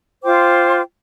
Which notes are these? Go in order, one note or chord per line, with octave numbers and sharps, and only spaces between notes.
F4 C5 G5 D6